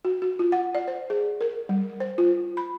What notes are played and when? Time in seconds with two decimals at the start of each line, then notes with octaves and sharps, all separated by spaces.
0.05 F#4
0.22 F#4
0.39 F4
0.52 F#5
0.75 D5
0.88 C5
1.10 G#4
1.41 A#4
1.69 G3
2.00 C5
2.18 F4
2.57 B5